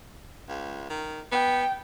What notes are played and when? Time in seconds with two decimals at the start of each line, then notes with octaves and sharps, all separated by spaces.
0.49 C#2
0.90 D#3
1.32 B3 G5